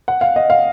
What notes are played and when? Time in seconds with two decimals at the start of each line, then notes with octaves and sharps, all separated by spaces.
0.08 F#5
0.21 F5
0.36 D#5
0.50 F5